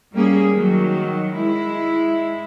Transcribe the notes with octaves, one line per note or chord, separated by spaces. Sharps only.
G3 A#3 C#4 G#4
D#3 F#3
G#3 E4